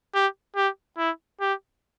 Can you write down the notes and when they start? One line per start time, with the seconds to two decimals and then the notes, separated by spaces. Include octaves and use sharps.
0.14 G4
0.56 G4
0.98 E4
1.41 G4